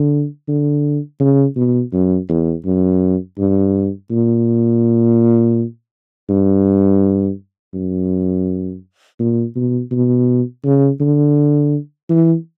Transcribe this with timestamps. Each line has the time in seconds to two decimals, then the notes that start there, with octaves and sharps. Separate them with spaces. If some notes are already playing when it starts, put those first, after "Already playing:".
Already playing: D3
0.48 D3
1.20 C#3
1.56 B2
1.93 F#2
2.29 E2
2.65 F#2
3.38 G2
4.11 A#2
6.29 G2
7.74 F#2
9.19 A#2
9.55 B2
9.91 B2
10.64 C#3
11.00 D3
12.09 E3